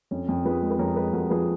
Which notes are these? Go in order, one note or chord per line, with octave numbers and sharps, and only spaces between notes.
F2 C#4
F2
F3 G#4 B4
G#3
B4
F2 A#4 C#5
G#3 G#4 B4
F2 F#4 A#4
F3 G#4 B4